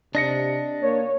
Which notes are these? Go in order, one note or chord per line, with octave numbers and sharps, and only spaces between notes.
C3 D4 D#5 A#6 C#7
A#3 C#5